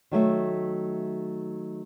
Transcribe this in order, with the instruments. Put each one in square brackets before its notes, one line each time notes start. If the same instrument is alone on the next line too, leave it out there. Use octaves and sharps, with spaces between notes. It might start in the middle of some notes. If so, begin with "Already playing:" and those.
[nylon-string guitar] D#3 F#3 A3 E5